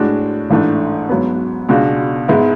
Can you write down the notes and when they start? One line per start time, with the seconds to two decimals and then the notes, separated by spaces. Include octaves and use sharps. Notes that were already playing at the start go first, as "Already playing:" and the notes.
Already playing: A2 G#3 D4 F#4
0.50 A1 G#2 E3 A3 D4
1.09 G#2 F#3 B3
1.69 C#2 B2 G#3 D4 F#4
2.28 G#2 G#3 B3 E4